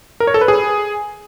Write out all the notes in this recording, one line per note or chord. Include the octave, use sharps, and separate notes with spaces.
A#4
C#5
A4
B4
G#4